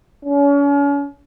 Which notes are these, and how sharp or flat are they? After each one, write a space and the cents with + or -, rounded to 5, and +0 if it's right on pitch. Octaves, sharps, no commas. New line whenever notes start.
C#4 +40